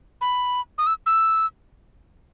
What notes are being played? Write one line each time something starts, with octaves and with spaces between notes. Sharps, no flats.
B5
D#6
E6
E6